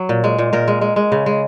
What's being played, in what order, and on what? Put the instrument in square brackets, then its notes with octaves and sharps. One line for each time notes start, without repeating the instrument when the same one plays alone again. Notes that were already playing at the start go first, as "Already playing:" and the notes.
Already playing: [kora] F#3
A#2
G#3
A#2
A#2 A#4
G#3
G#3
G#3
C#3
G#3